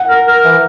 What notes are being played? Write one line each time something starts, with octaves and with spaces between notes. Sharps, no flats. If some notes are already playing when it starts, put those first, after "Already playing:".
Already playing: F#5
A#4
A#4
E3